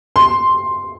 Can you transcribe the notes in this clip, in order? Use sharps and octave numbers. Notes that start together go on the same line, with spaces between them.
C6